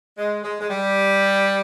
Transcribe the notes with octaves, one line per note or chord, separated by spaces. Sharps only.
G#3
G#3
G#3
G3